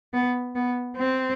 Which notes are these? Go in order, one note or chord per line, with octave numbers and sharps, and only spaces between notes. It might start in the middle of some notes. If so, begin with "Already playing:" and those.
B3
B3
C4